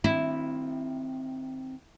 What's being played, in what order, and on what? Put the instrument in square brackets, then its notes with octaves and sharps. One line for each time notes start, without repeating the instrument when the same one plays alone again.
[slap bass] D#3 C4 [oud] E4